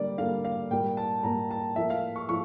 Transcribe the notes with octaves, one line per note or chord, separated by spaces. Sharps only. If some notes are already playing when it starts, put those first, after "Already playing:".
Already playing: D3 G3 A#3 D5
D3 G3 A#3 F5
F5
A#2 G3 A#3 G5
A5
A#2 G3 A#3 A#5
A5
A2 F3 A#3 E5
F5
C#6
A2 F3 C#6